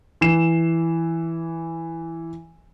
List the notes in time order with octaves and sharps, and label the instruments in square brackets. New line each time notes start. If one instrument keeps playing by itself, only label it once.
[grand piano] E3 C7 E7